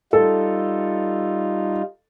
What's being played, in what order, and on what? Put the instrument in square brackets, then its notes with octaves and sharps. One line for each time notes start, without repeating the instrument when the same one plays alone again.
[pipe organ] G3 D#4 F4 [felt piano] A4